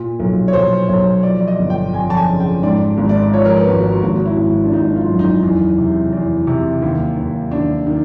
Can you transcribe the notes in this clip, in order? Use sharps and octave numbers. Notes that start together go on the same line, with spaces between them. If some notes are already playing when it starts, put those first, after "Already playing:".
Already playing: A#2
B1
C#5
B1 C5
B1 C#5
F3 D5
D5
D#5
G1
G5
F2 G#5
A5
G#5
C#3
G5
G#2 D5
G#1
D5
D5
F3 C#5
A#4
B4
G#1
F#4
G#1 F#4
E4
G#1
D4
G#1 D#4
F4
F#2
D#4
E2 D#4
C3
E2
C3
D#2
D#2
D#2 D4
D#3